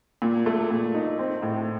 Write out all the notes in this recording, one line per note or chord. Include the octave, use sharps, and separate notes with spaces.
A#2
A3
A#2
D#4
C4
A2